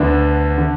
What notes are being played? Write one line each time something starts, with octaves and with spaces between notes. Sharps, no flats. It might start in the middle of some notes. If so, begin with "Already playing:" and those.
Already playing: D2 D3 B3 D4
D3